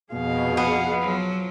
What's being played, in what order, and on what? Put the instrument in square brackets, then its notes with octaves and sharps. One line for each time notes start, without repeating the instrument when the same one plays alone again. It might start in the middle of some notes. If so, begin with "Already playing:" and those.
[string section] F2 B2 [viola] G#4 F5
[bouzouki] B3 [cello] F#5
[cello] F3 F#3